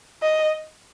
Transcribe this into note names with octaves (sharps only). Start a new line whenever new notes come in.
D#5